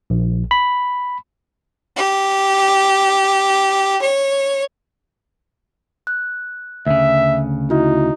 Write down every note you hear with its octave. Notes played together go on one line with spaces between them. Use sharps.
A#1
B5
G4
C#5
F#6
D2 C#3 E5
D#4 E4 F#4